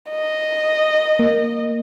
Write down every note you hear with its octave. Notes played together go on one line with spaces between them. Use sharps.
D#5
A#3